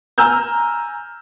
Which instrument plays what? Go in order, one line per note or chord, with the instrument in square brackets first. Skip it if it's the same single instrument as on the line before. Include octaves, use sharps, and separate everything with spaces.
[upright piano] G#5 A#5 E6 F6 G6